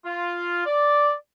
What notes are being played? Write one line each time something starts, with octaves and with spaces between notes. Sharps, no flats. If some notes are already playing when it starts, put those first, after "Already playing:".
F4
D5